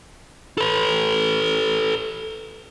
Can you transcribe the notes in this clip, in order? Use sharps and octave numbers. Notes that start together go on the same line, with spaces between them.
A4 B4